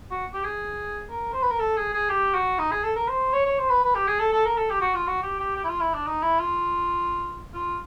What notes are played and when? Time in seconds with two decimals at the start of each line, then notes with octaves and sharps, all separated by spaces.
0.11 F#4
0.34 G4
0.44 G#4
1.10 A#4
1.33 C5
1.43 B4
1.51 A#4
1.59 A4
1.77 G#4
1.93 G#4
2.09 G4
2.34 F#4
2.59 D#4
2.71 G#4
2.84 A4
2.96 A#4
3.08 C5
3.33 C#5
3.46 C#5
3.59 C5
3.70 B4
3.83 B4
3.95 G4
4.07 G#4
4.20 A4
4.33 A4
4.45 A#4
4.57 A4
4.70 G4
4.81 F#4
4.95 F4
5.07 F#4
5.23 G4
5.39 G4
5.56 G4
5.64 E4
5.69 F4
5.80 E4
5.94 D4
6.06 D#4
6.22 E4
6.39 F4
7.54 F4